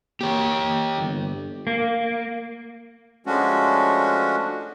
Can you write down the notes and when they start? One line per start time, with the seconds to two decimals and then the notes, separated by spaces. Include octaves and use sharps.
0.21 A#3 G4 C#5
0.97 G1
1.67 A#3
3.26 F3 G#3 A3 C#4 D4 F#4